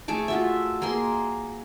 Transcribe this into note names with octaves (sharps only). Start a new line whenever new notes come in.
A3 G#4 A5 D6
F4 F#4 E5
A#3 G#4 C6